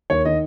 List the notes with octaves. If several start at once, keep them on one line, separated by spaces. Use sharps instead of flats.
D#2 C#5
D#3 D#5